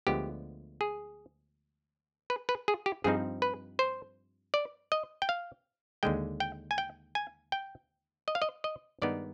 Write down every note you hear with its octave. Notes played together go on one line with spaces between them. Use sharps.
D2 D3 F3 G#3 B3 G4
G#4
B4
B4
G#4
G4
G2 F3 C4 D#4 G#4
B4
C5
D5
D#5
G5
F5
D#2 D3 G#3 G5
G5
G#5
G5
G#5
G5
D#5
F5
D#5
D#5
G2 D#3 G#3 B3 D#4 D5